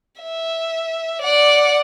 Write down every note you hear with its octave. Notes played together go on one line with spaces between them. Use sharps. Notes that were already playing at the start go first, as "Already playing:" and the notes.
E5
D5 F#5